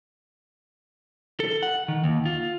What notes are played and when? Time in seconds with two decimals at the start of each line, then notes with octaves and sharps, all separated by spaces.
1.40 A4
1.63 F#5
1.88 D#3
2.04 D#2
2.26 F4